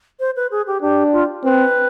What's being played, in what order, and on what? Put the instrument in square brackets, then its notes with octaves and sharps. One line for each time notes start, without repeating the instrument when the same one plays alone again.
[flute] C5
B4
G#4
G4
[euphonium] D4 [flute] G4
[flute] F4
[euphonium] C4 [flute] B4